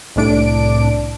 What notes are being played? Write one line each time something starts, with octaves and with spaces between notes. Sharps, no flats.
C2 A2 D4 D7